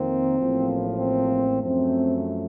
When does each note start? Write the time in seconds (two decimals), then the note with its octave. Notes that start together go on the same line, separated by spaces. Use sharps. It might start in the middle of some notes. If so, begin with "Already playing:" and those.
Already playing: F2 D#3 A#3 C4
0.39 A1 A2 F3 A#3
0.99 C4
1.59 F#2 F3 A3 C4